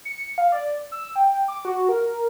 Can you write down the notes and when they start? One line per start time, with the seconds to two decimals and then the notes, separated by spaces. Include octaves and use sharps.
0.05 C#7
0.38 F5
0.52 D5
0.92 E6
1.16 G5
1.48 D6
1.65 F#4
1.89 A#4